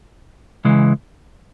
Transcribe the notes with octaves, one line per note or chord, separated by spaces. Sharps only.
C#3 E3 G#3